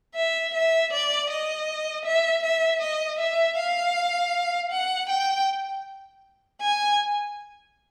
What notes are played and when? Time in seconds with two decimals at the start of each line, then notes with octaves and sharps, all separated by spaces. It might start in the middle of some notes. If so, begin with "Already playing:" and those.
0.15 E5
0.54 E5
0.92 D5
1.29 D#5
2.05 E5
2.43 E5
2.81 D#5
3.19 E5
3.58 F5
4.71 F#5
5.09 G5
6.61 G#5